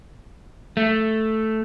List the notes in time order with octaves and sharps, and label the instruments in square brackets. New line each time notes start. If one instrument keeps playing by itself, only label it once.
[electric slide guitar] A3